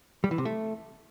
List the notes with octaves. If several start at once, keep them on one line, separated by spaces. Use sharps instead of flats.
G3
E3
C3
A3